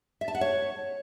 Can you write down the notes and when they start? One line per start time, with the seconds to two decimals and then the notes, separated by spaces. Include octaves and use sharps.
0.21 E5
0.28 A5
0.35 F#5
0.41 C#5